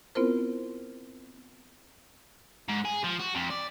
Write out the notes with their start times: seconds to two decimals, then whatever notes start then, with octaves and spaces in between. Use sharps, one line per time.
0.15 B3 C4 E4 F4 A#4 C5
2.69 G#2
2.85 G#4
3.04 F3
3.20 F#4
3.35 F2
3.51 D5